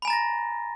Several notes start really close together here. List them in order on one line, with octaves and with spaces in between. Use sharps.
B5 G#5 A#5 A6 A#6